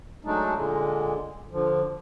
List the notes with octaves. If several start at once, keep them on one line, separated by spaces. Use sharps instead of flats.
F#3 G#3 A3 D4 D#4
A#2 D3 G#3
D3 F3